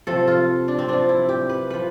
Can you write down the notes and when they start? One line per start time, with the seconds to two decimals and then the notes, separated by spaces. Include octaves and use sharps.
0.07 C3 F3 A4
0.27 F4
0.68 D4
0.78 C4
0.88 C3 F3 D4
1.09 E4
1.29 G4
1.49 B4
1.70 F3 B4